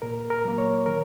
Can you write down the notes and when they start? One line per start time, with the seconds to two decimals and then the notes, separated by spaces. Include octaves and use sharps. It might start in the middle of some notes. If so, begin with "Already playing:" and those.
0.02 A#2 A#4
0.30 A#4
0.45 F#3 A#3
0.58 C#5
0.86 D#3 A#4